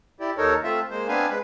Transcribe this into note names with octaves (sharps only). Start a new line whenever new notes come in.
E4 G4 D5
D#2 D#4 A4 A#4 C#5
A3 C4 F4 E5
G#3 A#3 C5
B3 C4 D4 B4 F5 G#5
G#3 B4